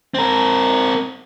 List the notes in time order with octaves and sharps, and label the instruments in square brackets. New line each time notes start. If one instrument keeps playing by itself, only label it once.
[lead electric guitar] C4 A#4